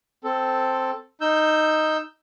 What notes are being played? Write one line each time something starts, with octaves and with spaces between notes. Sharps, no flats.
C4 A4
D#4 E6 G6